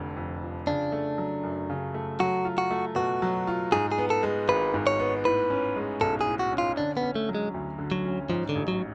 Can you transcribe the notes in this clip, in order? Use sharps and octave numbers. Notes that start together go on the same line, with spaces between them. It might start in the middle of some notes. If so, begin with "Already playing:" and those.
Already playing: F1 F2 D3
F2
F3
C#3 D4
A3
F#3
F#2
C#3
A3
F#3 F#4
F4
F#4
A3
B2 F#4
F#3
F4
G#2 G#4
G#4
B3
A4
G#3
G#1 B4
G#2
C#5
B3
A2 B4
C#4
G#3
B1 A4
G#4
A2
F#4
C#4
F4
D3 D4
B3
C#4
A3
F#3
G#3
D2
D3
F#3
C#4
G#2 F3
D3
A1
F#3